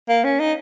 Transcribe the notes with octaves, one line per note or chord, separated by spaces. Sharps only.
A#3
C#4
D#4